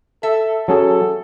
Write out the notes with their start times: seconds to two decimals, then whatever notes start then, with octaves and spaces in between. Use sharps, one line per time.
0.23 A4 E5
0.68 F#3 C#4 G#4 A4